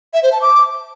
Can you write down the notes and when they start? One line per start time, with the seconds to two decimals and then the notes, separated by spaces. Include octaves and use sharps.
0.14 E5
0.23 C5
0.32 A5
0.42 D6